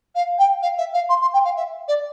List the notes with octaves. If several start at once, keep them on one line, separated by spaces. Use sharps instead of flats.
F5
G5
F5
E5
F5
C6
C6
G5
F5
E5
D5